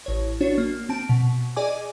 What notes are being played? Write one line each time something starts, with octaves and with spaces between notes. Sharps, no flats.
A1 C#5
D4 F#4 C#5
A#3
C4 A5 D7
B2
G#4 D5 D#5 G#5 D6